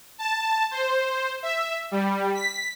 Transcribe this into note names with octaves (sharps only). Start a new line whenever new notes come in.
A5
C5
E5
G3
B6